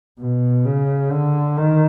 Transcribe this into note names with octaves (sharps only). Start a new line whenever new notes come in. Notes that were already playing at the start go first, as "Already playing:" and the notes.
B2
C#3
D3
D#3